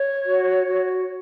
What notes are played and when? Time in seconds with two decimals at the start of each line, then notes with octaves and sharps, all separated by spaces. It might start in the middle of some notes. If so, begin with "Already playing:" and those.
Already playing: C#5
0.26 F#4
0.66 F#4